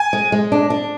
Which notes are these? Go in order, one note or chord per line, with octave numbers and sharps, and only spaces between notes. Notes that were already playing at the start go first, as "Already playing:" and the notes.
Already playing: G#5
G#3
G#3
D4
D4